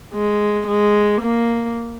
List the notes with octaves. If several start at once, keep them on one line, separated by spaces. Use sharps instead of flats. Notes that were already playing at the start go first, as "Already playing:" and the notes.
G#3
G#3
A#3